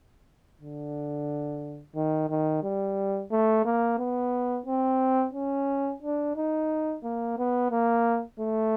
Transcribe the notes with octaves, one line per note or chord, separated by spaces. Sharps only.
D3
D#3
D#3
G3
A3
A#3
B3
C4
C#4
D4
D#4
A#3
B3
A#3
A3